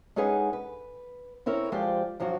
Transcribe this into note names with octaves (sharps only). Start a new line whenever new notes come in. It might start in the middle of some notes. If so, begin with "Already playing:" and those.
G#3 C#4 D#4 G#4 B4 F#5
B4
C4 C#4 E4 A#4 C#5
F3 G#3 F4 G4 C5 D5
G2 F3 F#3 F4 F#4